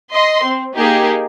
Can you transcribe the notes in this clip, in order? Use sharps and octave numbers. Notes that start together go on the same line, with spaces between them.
D#5 C6
C4
A#3 D#4 G4 G#4